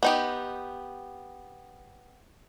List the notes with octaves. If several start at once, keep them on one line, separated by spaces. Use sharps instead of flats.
B3 D#4 G4